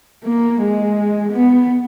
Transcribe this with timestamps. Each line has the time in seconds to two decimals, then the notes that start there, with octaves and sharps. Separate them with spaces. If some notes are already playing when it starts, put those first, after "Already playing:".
0.25 A#3
0.61 G#3
1.33 B3